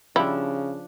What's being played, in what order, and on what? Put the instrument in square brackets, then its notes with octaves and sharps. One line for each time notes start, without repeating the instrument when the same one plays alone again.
[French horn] C#3 [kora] F3 D4 [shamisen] G3 E4